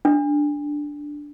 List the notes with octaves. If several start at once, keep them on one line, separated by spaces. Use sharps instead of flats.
D4